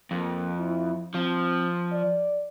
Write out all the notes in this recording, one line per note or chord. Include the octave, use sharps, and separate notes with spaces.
F2 A#3
E4
F3 C4
D5